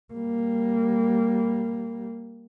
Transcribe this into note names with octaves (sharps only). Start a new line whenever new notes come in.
G3 A#3